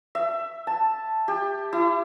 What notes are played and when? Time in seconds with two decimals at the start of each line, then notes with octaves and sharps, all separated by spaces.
0.15 E5
0.67 A5
1.28 G4
1.73 E4